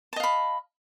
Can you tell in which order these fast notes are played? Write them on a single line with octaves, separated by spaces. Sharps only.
A5 D#5 F5 B5